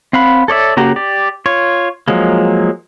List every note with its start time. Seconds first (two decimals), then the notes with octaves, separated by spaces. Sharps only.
0.13 C4 F5 F#5 B5
0.48 A4 C#5 D5 E5
0.77 C#3 A#3 F#4 G4 A#5
0.96 G4 D5
1.46 F4 C#5
2.08 F3 F#3 G#3 A#3